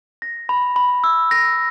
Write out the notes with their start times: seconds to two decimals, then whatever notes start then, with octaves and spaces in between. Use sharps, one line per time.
0.22 A#6
0.49 B5
0.76 B5
1.04 E6
1.31 A#6